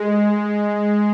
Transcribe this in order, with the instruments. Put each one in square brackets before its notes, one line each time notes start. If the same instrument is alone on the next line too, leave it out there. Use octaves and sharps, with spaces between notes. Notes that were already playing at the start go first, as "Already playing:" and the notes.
Already playing: [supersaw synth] G#3